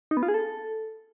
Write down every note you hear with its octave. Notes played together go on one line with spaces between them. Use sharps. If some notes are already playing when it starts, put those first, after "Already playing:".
D#4
B3
F4
G#4
A4